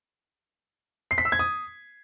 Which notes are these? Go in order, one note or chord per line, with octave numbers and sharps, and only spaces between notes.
C7
B6
E6
G#6
D#6